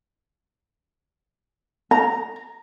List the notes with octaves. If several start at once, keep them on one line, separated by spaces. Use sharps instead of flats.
A#5